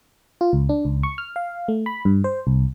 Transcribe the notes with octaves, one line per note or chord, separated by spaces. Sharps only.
F4
C#2
D4
C#2
C#6
F6
F5
A3
B5
G2
C5
C2